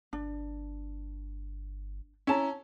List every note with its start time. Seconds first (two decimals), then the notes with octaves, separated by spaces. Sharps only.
0.13 G1 D4
2.27 C#4 E4 A5 A#5